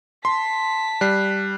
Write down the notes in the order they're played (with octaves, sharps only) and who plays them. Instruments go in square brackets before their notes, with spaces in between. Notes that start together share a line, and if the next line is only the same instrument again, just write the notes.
[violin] A5 B6 [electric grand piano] C6
[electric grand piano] G3 [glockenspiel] F#6 C7